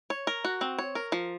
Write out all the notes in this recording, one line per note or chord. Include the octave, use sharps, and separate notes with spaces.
C#5
A#4
F#4
C4
C#5
A#4
F3